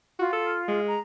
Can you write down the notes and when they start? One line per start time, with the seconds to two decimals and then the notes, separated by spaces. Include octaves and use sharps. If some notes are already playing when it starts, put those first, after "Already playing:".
0.19 F4 F#4
0.33 A4
0.68 G#3
0.87 A#5